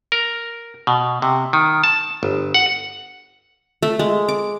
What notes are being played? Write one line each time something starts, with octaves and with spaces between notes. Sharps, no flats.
A#4
B2
C3
D#3
A5
G1
F#5
A3
G#3
D6